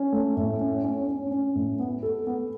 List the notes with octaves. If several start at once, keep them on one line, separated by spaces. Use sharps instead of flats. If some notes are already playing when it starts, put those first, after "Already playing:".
Already playing: C#4
A3
A2
C#4
C#4
C#4
C#4
A2
B3
A4
B3